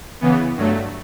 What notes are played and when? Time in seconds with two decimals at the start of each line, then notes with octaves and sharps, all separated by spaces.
0.21 C#3 E3 B3
0.56 G2 F#3 A3